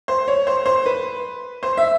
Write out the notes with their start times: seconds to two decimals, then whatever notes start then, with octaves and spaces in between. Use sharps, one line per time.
0.08 C5
0.28 C#5
0.47 C5
0.66 C5
0.86 B4
1.63 C5
1.77 E5